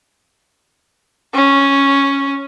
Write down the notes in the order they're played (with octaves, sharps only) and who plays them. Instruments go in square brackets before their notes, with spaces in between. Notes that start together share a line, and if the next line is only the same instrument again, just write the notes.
[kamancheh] C#4